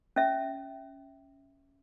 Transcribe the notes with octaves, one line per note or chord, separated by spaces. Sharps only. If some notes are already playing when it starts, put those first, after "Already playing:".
C#4 E5